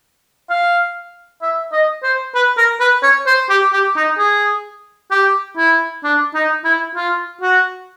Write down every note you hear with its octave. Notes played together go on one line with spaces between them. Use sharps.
F5
E5
D#5
C5
B4
A#4
B4
C#5
C5
G4
G4
D#4
G#4
G4
E4
D4
D#4
E4
F4
F#4